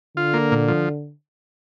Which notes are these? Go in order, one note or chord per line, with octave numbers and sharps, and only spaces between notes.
D3 F4
A#3
A#2
F3